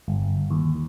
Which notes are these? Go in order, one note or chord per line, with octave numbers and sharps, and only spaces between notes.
G1
D#2